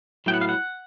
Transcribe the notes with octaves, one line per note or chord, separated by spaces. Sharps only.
A2 F#3 B3 E4 G5
F#5
F5
F#5